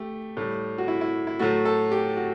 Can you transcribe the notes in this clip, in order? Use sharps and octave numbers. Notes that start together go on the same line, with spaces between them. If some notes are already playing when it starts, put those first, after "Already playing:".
Already playing: A3 G4
A2 G3
F#4
E4
E4
E4
A2 F#3 A3 F#4
A4
G4
F#4